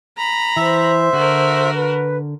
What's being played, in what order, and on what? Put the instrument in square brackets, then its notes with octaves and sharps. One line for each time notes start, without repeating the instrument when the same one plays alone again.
[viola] A#5 B5
[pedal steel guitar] E3 [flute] C5 [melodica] E5
[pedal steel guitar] D3 [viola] F#4 A#4
[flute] B4